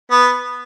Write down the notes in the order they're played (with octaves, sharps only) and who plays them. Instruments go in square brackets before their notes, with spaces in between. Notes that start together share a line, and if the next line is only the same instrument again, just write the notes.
[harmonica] B3